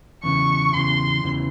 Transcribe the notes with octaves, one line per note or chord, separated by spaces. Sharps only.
E2 C#3 E3 C#6
E2 C#3 E3 C6
E2 C#3 E3